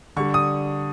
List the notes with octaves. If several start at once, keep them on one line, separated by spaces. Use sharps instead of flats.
D3 G3 C#6
D#6